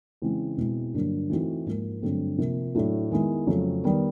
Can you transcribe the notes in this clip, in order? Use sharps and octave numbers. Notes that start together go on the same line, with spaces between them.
C#3 E3 G#3 C4 E4
B2 G#3 C4 E4
G2 D3 F#3 A#3 D4
E3 A3 C4 D#4 F#4
G#2 F3 A#3
G2 D3 F#3 A3 C4
C3 F3 A#3
A2 F#3 A3 D4 F#4
D#3 G#3 B3 E4
F2 C#3 F#3 A3 C4
D#3 G3 B3